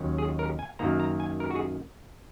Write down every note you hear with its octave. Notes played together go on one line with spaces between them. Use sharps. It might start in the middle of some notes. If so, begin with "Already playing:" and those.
Already playing: D#2 D#3 F#3 C#4
G#4
A#4
G#5
F#2 D#3 A#3 A#5
A#5
G#5
A#4
F#4
G#4